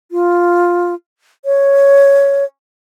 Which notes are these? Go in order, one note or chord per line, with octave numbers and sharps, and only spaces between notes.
F4
C#5